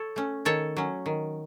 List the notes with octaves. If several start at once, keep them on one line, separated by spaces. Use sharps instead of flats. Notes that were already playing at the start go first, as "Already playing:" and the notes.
Already playing: A4 C#5
A3 C#4
D#3 A4 C#5
F#3 C#4
D#3